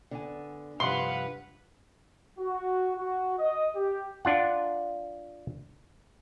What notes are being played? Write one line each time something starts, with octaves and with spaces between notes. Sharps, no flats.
D3 B3 G#5
G2 C3 F3 B4 F5 F#5 C6
F#4
F#4
D#5
G4
D4 F4 F#5